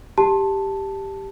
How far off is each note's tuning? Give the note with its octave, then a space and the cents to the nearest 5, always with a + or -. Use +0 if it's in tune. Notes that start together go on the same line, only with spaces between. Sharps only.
G4 +0 A5 +0